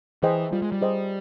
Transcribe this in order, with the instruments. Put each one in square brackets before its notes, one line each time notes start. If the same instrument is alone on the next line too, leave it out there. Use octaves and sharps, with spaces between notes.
[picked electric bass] E3 [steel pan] G#4 C5 D#5 G5
[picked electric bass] G3 [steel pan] F4
[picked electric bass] G#3
G3
[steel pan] G#4 C5 D#5 G5